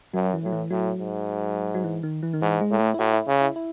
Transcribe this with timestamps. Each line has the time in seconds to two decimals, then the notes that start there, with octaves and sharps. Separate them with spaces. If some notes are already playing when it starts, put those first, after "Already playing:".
0.14 F#2 F#3
0.33 E3
0.43 A2 F#3
0.52 E3
0.71 A2 F#3
0.99 G#2
1.75 F#3
1.84 E3
2.03 D#3
2.23 E3
2.33 D#3
2.42 G#2 E3
2.61 G#3
2.70 A2
2.79 A3
2.94 E4
2.99 A2 F#4
3.13 E4
3.27 C#3
3.41 E4
3.56 E4